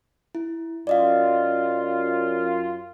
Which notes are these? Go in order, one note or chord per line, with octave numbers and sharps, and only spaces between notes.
E4
F#2 F4 D5 D#5 F5